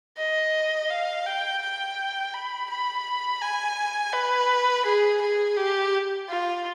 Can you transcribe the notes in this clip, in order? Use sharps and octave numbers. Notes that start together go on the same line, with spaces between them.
D#5
F5
G5
G5
B5
B5
G#5
B4
G#4
G#4
G4
F4